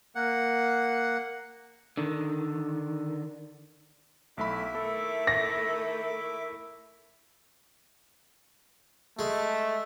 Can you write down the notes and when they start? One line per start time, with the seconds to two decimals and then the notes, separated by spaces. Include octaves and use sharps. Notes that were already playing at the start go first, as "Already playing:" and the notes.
0.15 A#3 F#5
1.97 D3 D#3
4.37 B1 A3 E4 E5 B5 D6
4.75 D#3 A3 A4
5.27 A#6
9.19 G#3 A3